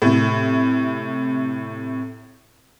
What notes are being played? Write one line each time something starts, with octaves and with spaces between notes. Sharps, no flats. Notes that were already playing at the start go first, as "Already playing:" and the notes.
A2 C3